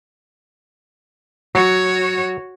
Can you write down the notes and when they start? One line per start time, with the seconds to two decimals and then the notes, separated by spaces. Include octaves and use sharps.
1.55 F#3 F#4 C#5